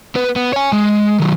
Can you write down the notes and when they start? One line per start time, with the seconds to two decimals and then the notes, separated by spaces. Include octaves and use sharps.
0.15 B3 B4
0.36 B3
0.53 C#5 G#5
0.73 G#3
1.20 D#3 F#3